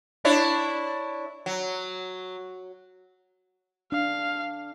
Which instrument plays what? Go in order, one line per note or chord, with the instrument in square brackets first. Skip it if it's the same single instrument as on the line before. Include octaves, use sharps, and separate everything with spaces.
[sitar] D4 E4 C#5
F#3
[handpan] D4 [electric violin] F5